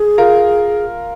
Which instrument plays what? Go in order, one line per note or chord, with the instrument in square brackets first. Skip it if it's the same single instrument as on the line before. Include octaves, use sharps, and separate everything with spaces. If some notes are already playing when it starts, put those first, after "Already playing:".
Already playing: [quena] G#4
[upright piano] F4 A#4